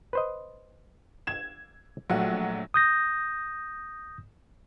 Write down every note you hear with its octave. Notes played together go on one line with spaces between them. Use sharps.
B4 C5 D#5
G#6 E7
A#1 F#3 A3 F#5
D#6 G6 A#6